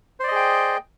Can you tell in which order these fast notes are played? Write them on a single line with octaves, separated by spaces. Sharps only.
C5 D5 D#5 G#4 G5